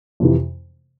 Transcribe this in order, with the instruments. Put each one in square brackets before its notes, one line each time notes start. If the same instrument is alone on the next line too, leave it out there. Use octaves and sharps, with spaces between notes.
[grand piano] F2 C3 E3